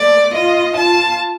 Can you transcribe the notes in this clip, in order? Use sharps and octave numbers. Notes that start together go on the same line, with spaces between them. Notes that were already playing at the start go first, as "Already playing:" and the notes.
Already playing: A3 D5
F4 D#5
F4 A5